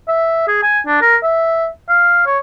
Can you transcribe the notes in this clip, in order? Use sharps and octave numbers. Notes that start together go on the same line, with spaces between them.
E5
G#4
G#5
D4
A#4
E5
F5
C#5